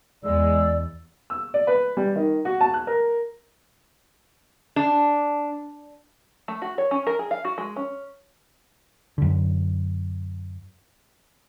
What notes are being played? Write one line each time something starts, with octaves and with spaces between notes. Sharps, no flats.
E2 G#3 D5 E6
E6
D5
B4
G3
D#3
F#4
A5
F#6
A#4
D4
A3
F#4
C#5
C#4
A#4
G#4
F5
F#4
G#3
C#4
F#2 D3